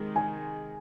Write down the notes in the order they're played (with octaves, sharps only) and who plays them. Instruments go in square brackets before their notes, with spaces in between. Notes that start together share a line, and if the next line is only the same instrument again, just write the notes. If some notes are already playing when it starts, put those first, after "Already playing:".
Already playing: [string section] C3 D#3 G#3
[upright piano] G#5